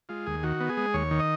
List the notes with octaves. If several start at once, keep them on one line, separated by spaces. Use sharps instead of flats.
G#3 F4
D#2 G#4
D#3 F#4
B3
G#4
G#3
D#2 C#5
D#3
D#5